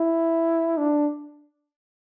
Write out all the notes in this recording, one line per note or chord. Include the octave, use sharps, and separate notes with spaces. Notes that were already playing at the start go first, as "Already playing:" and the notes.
Already playing: E4
D4